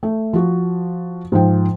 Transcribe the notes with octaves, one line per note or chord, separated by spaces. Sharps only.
A3
F3 F#4
G#2 F3 G5